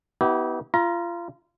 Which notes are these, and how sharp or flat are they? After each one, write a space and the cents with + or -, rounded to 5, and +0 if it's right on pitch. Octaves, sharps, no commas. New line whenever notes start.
B3 +0 E4 -40 G4 -25
F4 -25 A#5 +25